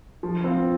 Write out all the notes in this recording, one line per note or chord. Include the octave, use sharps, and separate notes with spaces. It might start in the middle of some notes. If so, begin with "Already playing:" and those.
F3
C4 F4